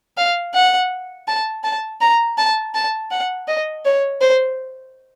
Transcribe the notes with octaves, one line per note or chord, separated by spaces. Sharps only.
F5
F#5
A5
A5
A#5
A5
A5
F#5
D#5
C#5
C5